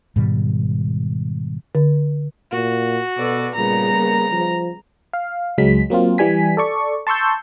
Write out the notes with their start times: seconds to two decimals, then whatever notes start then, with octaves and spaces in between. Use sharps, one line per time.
0.16 G#2 B2 D#3 G3
1.75 D3
2.52 A#2 F#4
3.17 B2 A4 B4 D5
3.55 A#2 C#3 G3 B3 A#5
3.93 A#3
4.32 F3
5.13 F5
5.58 C#2 F#3 G#3 B6
5.90 F#3 A#3 C4 F4
6.18 E3 G3 G#5 B6
6.57 A4 D5 C#6
7.07 A5 C6 C#6 E6 G6